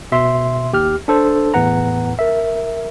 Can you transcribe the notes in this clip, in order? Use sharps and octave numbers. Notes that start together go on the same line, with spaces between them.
B2 E5 C6
D#2 G4 F6
D4 A4 C5
E2 A2 B4 F#5 A#5
A#4 E5